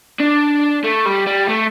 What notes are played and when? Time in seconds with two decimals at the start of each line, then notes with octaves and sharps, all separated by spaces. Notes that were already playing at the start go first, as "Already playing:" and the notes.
0.20 D4
0.84 A3
1.06 G3
1.27 G3
1.49 A3